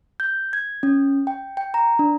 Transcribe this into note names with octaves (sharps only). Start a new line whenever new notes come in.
G6
G#6
C#4
G5
G5
A#5
D4